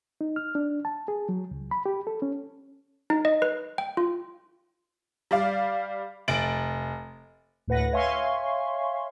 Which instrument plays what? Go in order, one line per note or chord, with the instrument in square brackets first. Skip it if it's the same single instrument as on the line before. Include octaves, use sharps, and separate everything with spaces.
[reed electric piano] D#4
F6
D4
A5
G#4
F#3
C#2
B5
G4
A4
C#4
[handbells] D#4
D#5
B4
G5
F4
[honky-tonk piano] G3 D5 F5
F1 A6 D7 F#7
[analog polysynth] D2 A2 B4 F#5 A#6
C#5 E5 F5 G#5 C6 C#6